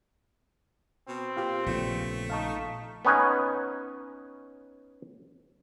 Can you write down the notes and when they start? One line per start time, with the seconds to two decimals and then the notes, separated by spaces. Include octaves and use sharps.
1.08 B2 C4
1.37 A#2 F4 G4
1.66 A#1 C#3 A3 B3 F4
2.30 D#4 F5 A5 C#6
3.05 B3 C#4 D#4 B4 G#5